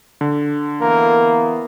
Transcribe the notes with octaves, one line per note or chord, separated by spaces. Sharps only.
D3
E3 A#3 B3 A#4